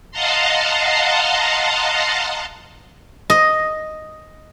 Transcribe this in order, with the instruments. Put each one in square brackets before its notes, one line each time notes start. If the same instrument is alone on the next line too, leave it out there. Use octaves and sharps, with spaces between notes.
[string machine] D#5 F5 F#5 A5 A#5 C6
[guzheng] D#5